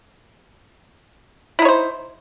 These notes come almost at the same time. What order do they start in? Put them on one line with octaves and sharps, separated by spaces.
E4 D#4 C#5 C5